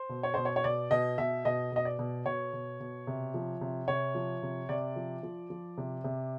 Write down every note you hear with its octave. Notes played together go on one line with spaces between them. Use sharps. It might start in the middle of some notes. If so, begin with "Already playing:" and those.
Already playing: C5
B2
C#5
B2 C5
C#5
C#5
B2 D5
B2 D#5
B2 E5
B2 D#5
B2 D#5
D5
B2
B2 C#5
B2
B2
C3
F3
C3
C3 C#5
F3
C3
C3 D5
F3
F3
F3
C3
C3